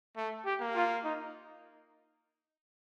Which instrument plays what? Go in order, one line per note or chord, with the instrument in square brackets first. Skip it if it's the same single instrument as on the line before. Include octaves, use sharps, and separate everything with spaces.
[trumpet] A3
[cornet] G4
[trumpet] A#3
[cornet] F4
D#4